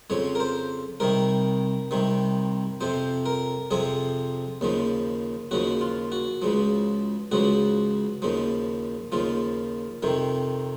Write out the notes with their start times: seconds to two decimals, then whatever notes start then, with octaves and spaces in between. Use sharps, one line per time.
0.10 F2 C#3 F3 C#5
0.35 A#4
0.40 C5
1.00 C2 C3 D#3 A#4
1.91 C2 C3 D#3
2.81 F2 C3 F3 C5
3.26 A#4
3.71 F2 C3 F3 G#4
4.61 D#2 C#3 F3
5.51 D#2 C#3 F3 F#4
5.81 F4
6.12 F#4
6.42 C#2 C#3 F3
7.32 C#2 C#3 F3 F#4
8.22 D#2 C#3 F3
9.12 D#2 C#3 F3 F4
10.03 F2 C3 D#3